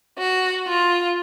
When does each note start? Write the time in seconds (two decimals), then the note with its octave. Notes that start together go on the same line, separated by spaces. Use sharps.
0.18 F#4
0.67 F4